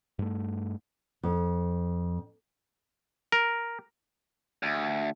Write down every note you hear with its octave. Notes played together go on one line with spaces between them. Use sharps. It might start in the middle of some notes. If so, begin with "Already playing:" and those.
G2 A3
F2
A#4
D2